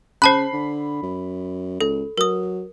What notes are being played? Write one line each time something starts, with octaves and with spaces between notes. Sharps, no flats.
C#3 C5 A5 B5 F#6 C7
D3
F#2
C#2 A4
F#3 A#4 D#6